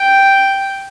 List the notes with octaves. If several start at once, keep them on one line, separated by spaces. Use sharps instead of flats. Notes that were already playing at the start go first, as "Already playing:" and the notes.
Already playing: G5